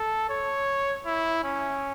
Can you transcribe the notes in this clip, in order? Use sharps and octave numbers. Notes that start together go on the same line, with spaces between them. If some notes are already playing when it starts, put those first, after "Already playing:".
Already playing: A4
C#5
E4
C#4